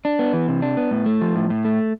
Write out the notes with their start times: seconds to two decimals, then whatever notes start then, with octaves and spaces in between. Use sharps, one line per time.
0.05 D4
0.19 B3
0.33 E3
0.48 C3
0.62 D4
0.77 B3
0.91 A2
1.06 A3
1.22 F3
1.36 A2
1.50 A2
1.65 A3